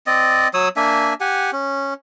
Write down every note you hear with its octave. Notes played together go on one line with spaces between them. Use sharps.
C4 D5 D#5
F#3 C#5 D#6 E6
A#3 D4 E5 G#5
G4 F#5 G#5
C#4